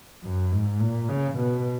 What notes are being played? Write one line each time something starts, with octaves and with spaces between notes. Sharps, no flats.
F#2
G#2
A#2
C#3
B2